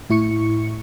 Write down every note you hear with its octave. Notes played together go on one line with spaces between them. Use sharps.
A2 E4 C#6 C#7